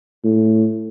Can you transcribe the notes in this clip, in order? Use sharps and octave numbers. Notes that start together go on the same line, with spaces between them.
A2